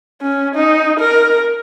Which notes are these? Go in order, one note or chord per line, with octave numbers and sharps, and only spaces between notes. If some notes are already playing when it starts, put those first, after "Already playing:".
C#4
D#4
A#4